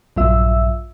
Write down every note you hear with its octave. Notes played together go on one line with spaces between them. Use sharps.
A#1 G2 F#3 F4 E5 E6